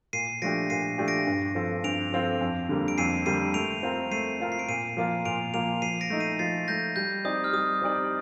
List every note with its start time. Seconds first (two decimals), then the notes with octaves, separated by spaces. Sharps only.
0.13 A#2 C7 D#7
0.42 F3 A3 D4 G4 A#6 D7
0.70 A#2 C7 D#7
0.98 F3 A3 D4 G4
1.08 A#6 D7
1.27 G2
1.55 F3 C4 F4 A4
1.84 G2 D7 F7
2.12 F3 C4 F4 A4
2.41 F2
2.69 D3 G3 A#3
2.88 D7
2.98 F2 C7 D#7
3.26 D3 G3 A#3 C7 D#7
3.54 A3 D7 F7
3.83 C4 F4 A#4
4.11 A3 C7 D#7
4.40 C4 F4 A#4
4.52 C7
4.59 D7
4.68 A#2 C7 D#7
4.97 F3 A#3 F4 A#4
5.25 A#2 D7 F7
5.54 F3 A#3 F4 A#4 D7 F7
5.82 F3 C7 D#7
6.01 A#6 D7
6.10 A3 D#4
6.20 C7 D#7
6.39 F3 A6 C7
6.68 A3 D#4 G6 A#6
6.96 G3 G6
7.25 C4 D#4 G4 D5 D#6
7.44 F6
7.53 G3 D#6
7.82 C4 D#4 G4 D5